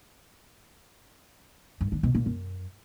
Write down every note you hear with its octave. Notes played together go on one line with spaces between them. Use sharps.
G2
D3
B2
A#2
F#2